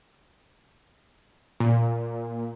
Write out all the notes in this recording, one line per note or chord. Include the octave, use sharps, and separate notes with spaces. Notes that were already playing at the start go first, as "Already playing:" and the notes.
A#2